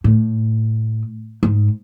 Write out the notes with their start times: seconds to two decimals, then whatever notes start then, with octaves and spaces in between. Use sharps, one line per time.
0.04 A2
1.43 G#2